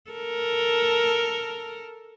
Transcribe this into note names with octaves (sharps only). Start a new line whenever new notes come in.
A4 A#4